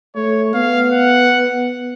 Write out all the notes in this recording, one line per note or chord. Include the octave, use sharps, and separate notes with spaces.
A3 C#5
B3 F5
F#5